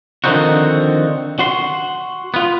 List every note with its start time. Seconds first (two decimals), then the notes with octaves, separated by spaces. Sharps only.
0.24 D3 D#3 F3 C4 D#4 F#4
1.39 F#4 C6
2.34 B3 F4